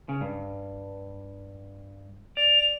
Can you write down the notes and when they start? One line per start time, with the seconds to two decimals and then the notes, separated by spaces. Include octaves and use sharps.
0.09 C#3
0.21 G2
2.37 D5 F7